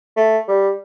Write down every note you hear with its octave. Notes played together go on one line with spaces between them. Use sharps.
A3
G3